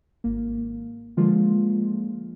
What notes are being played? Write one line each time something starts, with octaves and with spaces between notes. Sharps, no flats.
G#1 A#3
D3 F3 G#3 A#3 F4